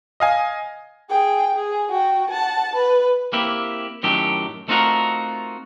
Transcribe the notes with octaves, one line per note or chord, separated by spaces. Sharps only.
D#5 F5 G#5
G#4 G5
G#4
F#4 G5
F#5 A5
B4
A#3 C4 E4 G4
F#2 A2 D#3 F#3 G4 A4
A3 C4 D#4 F4 F#4 A#4